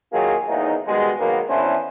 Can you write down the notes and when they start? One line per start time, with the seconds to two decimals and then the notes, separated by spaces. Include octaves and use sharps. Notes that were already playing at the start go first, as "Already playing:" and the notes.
0.12 D#3 F#3 A#3 F4 G#4
0.48 E2 A2 A#3 D#4
0.86 B2 D#3 G3 G#3
1.20 G#2 D#3 F#3 A#3 B3
1.49 E3 B3 C#4 D4 E4 C5